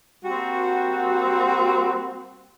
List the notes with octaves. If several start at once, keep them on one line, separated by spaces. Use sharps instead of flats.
G3 A#3 C4 F#4